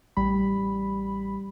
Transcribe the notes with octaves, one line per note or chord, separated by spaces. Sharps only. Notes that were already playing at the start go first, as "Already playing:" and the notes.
A1 G3 B5